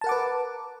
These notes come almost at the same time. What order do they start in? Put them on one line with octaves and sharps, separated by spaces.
A5 A#4 F#5 D6 B4